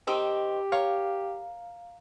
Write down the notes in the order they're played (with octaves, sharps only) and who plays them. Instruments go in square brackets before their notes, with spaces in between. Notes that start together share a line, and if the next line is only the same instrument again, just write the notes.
[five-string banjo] D#3 C4 D#4 [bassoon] G4
[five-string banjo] A#4 C#5 [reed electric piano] F5